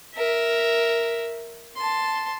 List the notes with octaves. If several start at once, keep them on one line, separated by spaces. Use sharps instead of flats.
A#4 E5
A5 C6